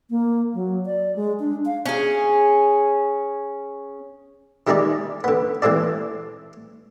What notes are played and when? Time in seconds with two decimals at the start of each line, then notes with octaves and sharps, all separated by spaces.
0.10 A#3
0.54 F#3
0.86 D5
1.16 G#3
1.39 D4
1.65 F5
1.86 C#4 G#4
4.67 D#3 G3 G#3 D#4 G#4 D5
5.24 D3 B3
5.62 E3 G#3 C4 A4 D5